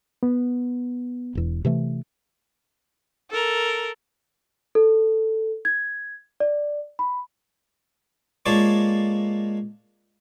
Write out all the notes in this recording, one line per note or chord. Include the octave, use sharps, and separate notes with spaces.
B3
E1 E2
C3 E3 A3
A4 A#4
A4
G#6
D5
B5
G#3 A#3 F4 A4 C#5 D5